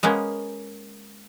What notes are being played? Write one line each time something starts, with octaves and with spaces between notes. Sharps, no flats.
G#3 A#3 B3 C#4